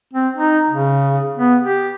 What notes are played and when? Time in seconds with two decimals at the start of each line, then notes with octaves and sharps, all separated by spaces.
0.13 C4
0.37 D#4
0.70 C#3
1.38 B3
1.61 G4